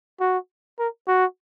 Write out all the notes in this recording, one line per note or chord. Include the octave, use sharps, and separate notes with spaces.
F#4
A#4
F#4